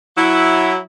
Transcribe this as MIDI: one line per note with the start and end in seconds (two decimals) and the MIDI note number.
0.17 0.78 54
0.17 0.78 64